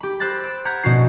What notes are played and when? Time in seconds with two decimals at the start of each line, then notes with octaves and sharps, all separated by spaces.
0.01 G4 B5
0.20 C5 B5 E6 F#6 A6 A#6
0.43 E6 D7
0.65 F#5 A#5 F6 G6 G#6 B6
0.83 A#1 B2 C#4 E4 F#4 C7